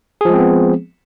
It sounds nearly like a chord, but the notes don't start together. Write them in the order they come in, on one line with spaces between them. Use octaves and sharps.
G#4 F3 G#3 C4 B3